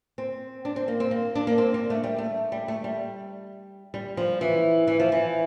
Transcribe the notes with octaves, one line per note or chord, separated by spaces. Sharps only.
C4
D4
C4
A#3
C4
A#3
D4
A#3
C4
A#3
A3
G3
A3
G3
A3
G3
G3
F3
E3
E3
F3
E3